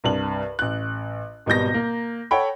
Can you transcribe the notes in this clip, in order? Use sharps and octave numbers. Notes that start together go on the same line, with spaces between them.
C2 G2 F#7
A1 F#6
G#1 B2 G3 G6 A#6
A#3
A4 C#5 F#5 G5 B5